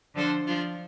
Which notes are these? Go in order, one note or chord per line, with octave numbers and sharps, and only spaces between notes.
D3 F3 D4 A4 C5
F3 D4 F4